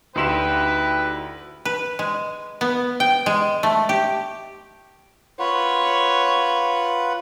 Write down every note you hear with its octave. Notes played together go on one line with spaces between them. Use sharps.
D2 D#4 E4 G4 B4 G5 C6 E7
B4
G#3
B3
G5
G#3
A3
G4
F4 B4 C#5 F#5